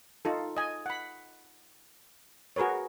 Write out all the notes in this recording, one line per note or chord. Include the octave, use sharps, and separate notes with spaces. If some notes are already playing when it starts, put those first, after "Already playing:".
D#4 F4 A4
D#5 G#5
F#5 B5
F#4 G#4 A#4 B4 C#5